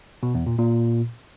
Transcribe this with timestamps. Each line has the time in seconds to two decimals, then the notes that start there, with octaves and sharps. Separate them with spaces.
0.23 B2
0.35 E2
0.46 A#2
0.58 A#2